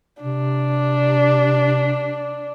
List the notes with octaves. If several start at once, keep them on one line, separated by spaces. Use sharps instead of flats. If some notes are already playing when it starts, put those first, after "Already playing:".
C3 D4